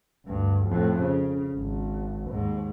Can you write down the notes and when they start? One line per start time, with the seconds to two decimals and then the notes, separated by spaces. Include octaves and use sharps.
0.26 D2 G2
0.66 F2 A2
1.01 C#3
1.54 G#1
2.30 D#2 G#2